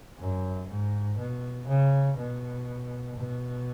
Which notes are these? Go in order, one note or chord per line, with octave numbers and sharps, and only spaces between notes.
F#2
G#2
B2
C#3
B2
B2